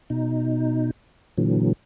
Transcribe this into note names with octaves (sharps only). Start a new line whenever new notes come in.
B2 D#4
A#2 D3 E3 F#3